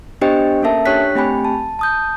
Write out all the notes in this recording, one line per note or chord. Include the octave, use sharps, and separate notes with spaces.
B3 D4 G4 C5 D#5 G5
A#3 C#4 A4 A#4 E5 A5
D4 G4 C#5 G5 F#6 B6
A3 C4 G4 G5 G#5 B5
A5
A5 D#6 G6